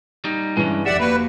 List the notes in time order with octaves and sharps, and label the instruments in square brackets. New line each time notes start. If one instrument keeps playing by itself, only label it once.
[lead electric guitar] G3 D#4
[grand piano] G2 E3 [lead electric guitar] G#3 C#4
[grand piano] F1 G4 [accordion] D5 F#5 [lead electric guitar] E5
[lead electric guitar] A#3 F#4 [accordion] B4